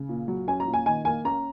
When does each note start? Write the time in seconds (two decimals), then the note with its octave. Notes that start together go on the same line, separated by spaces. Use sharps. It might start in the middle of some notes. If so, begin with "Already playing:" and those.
Already playing: C#3
0.09 A#2
0.28 F#3
0.48 C#4 G#5
0.60 A#5
0.67 A#2
0.74 G#5
0.86 D#3 G#5
1.05 A#3 G#5
1.25 C#4 A#5